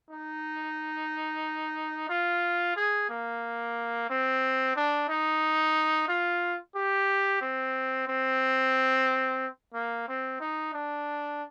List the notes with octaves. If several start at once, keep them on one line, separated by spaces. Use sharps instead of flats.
D#4
F4
G#4
A#3
C4
D4
D#4
F4
G4
C4
C4
A#3
C4
D#4
D4